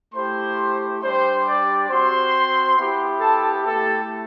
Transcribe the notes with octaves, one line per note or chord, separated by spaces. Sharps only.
A3 E4 G4 C5 C6
G3 D4 G4 C5 C6
D5 D6
C4 F#4 C5 C6
B3 E4 G4
A4 A5
A3 E4 G4 A4 A5